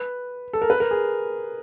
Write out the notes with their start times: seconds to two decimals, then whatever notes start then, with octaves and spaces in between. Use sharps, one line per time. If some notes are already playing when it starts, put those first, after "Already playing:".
Already playing: B4
0.53 A4
0.62 A#4
0.70 B4
0.80 A#4
0.91 G#4